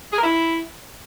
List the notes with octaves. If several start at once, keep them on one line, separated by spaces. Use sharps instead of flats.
G#4
A#4
E4